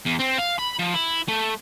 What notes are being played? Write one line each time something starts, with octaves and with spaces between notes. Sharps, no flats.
E2
C4
F5
B5
F3
E4
A3